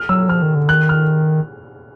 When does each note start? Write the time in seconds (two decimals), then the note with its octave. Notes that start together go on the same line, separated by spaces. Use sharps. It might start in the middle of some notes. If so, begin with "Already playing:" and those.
Already playing: F6
0.09 F#3 E6
0.29 F3 F6
0.42 D#3
0.55 D3
0.69 D#3 F#6
0.89 F6